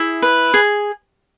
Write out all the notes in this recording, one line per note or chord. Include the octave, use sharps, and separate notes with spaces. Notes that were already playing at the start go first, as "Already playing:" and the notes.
Already playing: E4 G#4
B4
G#4